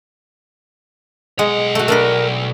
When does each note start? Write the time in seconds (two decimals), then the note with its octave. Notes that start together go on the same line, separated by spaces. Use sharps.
1.39 B1 G#3 F#5
1.75 A3 F#4
1.88 A3 D4 A#4 B4